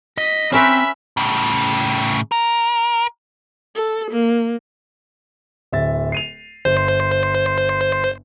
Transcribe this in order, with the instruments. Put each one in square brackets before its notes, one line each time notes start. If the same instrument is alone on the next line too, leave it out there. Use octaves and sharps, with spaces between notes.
[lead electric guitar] D#5 [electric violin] B6
[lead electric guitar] C4 [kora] C#4 A#4 B4 [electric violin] E5 B5
[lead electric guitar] A2 C#3
A#4
[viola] A4
A#3
[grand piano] D1 E5 A6
C7 D#7 F7
[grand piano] G1 [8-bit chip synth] C5